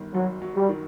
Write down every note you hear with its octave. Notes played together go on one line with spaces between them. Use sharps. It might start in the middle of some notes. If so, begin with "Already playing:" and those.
Already playing: G1 D#3
F#2 F#3
F#3
G3
D#3